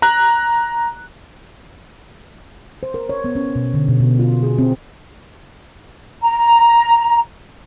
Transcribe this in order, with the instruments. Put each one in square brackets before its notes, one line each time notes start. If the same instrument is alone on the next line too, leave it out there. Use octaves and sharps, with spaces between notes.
[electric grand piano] A#5 F#6
[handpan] C5
A#4
C#5
B3
C#4
B2
D3
B2
B2
F4
G#4
C4
[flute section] A#5